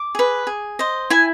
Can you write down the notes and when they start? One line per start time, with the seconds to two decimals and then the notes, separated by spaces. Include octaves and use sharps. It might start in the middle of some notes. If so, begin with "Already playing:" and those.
Already playing: D6
0.15 G#4 B4
0.47 G#4
0.79 C5 D#5
1.10 E4 G#5